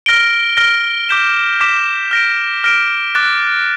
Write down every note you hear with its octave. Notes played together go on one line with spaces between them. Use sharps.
F6 A#6 D7 G7
F6 A#6 D7 G7
D6 G6 B6 E7
D6 G6 B6 E7
F6 A#6 D7
F6 A#6 D7
D6 F#6 A6